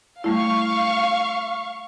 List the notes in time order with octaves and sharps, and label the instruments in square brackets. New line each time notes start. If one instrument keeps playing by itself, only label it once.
[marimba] G3 A3 E4 [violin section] F5 C#6